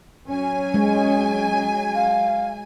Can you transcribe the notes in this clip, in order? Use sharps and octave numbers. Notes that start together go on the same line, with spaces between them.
F#3 C#4 G#5
G#3
F5